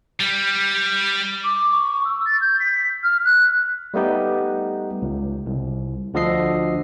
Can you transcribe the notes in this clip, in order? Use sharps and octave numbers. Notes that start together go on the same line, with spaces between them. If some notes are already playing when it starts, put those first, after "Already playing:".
G3
D6
C#6
E6
A6
G6
B6
F6
F#6
G3 A3 B3 D#4 G4
C#2
C2
D2 D3 F3 A4 D#5 C7